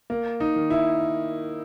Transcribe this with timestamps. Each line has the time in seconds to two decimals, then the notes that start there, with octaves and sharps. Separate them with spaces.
0.10 A#3
0.40 D#4
0.56 D#3
0.70 E4